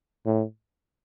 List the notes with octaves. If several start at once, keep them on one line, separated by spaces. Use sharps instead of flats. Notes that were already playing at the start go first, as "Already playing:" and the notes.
A2